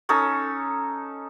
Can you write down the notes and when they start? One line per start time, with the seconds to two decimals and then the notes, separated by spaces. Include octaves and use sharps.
0.09 C#4 D#4 A4